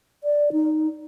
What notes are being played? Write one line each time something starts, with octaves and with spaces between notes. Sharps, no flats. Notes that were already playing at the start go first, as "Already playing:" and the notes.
D5
D#4